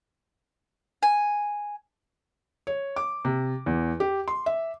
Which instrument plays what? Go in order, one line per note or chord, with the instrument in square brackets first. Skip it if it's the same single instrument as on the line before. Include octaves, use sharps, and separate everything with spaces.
[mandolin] G#5
[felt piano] C#5
D6
C3
E2
G4
C6
E5